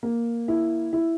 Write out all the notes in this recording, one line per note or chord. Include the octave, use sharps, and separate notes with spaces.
A#3
E4
E4